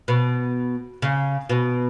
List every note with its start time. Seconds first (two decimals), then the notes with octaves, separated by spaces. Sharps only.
0.08 B2
1.02 C#3
1.49 B2